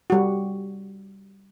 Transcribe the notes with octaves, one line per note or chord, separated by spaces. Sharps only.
G3 F#4